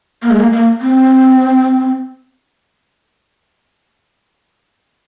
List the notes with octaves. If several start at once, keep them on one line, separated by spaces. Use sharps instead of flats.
A#3
G#3
A#3
A#3
C4